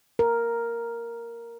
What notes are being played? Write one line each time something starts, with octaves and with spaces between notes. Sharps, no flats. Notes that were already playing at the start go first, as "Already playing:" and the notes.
A#4